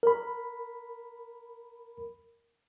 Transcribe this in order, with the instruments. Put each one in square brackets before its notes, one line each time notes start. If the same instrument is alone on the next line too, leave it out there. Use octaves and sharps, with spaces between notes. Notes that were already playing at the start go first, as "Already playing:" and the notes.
[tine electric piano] A#4 B5